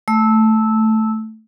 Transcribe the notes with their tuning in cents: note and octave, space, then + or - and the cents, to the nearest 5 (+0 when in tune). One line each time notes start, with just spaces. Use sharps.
A3 +0 E6 -15